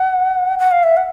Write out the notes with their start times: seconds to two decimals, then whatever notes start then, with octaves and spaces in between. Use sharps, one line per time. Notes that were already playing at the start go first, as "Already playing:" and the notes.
Already playing: F#5
0.59 F#5
0.72 F5
0.83 E5
0.97 F#5